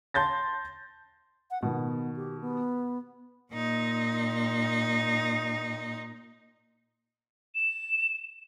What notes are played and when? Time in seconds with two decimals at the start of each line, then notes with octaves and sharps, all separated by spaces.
0.14 A5 C6 G6 A6 A#6
1.51 F#5
1.62 B2 D#3 B3
2.16 G4
2.41 B3
3.53 A#2 D#4
7.55 E7